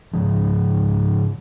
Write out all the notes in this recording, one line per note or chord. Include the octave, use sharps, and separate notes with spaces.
G#2 C#3 F3